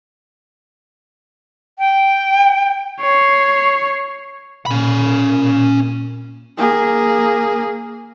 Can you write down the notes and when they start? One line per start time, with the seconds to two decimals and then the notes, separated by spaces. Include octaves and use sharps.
1.79 G5
3.01 C#5 C7
4.66 A#2 C#4 B5
6.58 A#3 G#4